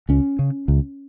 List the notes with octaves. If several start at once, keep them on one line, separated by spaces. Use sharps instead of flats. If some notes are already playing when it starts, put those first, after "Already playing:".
C#2 C#4
C#3
C#2